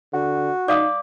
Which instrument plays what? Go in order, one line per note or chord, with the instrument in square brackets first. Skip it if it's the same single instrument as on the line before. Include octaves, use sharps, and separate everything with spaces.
[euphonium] D3 [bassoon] F#4
[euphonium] D#4 [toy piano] D5 F5 D#6 [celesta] D6